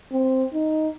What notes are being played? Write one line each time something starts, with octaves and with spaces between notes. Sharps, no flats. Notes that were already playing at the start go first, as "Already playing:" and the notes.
C4
D#4